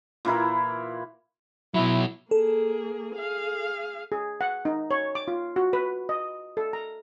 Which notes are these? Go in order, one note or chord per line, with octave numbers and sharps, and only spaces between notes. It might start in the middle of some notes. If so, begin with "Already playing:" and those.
A#2 E3 E4 A#4
B2 F#3 E4
A#3 G#4 A4
G#4 F5
G#4
F#5
D#4
C#5
D6
F4
F#4
B4
D#5
A4
A#5